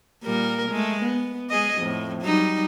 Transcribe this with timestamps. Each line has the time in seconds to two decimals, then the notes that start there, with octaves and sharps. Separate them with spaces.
0.23 A#2 G3 A#4
0.70 G#3 A3
1.02 B3
1.50 G#3 G#4 D#5
1.80 F2 A2
2.22 F#3 G3 D#4